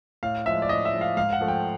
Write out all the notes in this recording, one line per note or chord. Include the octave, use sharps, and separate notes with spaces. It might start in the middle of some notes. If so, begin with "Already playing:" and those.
A2 F5
F3 G#3 E5
D5
A2 D#5
E5
F3 G#3
F5
G#2 F5
F#5
F3 A3
G5